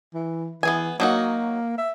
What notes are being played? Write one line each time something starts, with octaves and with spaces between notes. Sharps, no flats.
E3
E3 B3 G#4 G#5
F#3 A#3 D#4 F#4
E5